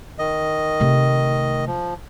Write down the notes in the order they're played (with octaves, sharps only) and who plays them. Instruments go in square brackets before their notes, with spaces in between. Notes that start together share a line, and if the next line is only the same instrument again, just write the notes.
[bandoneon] D#3 D#5
[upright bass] C3 A3
[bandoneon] F3